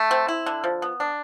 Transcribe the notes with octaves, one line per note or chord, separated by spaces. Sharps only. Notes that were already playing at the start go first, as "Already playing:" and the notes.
Already playing: A3
C4
E4
D3
F3
B3
D4